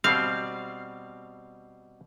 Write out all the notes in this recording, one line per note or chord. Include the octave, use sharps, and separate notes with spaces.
B2 G3 C4 F5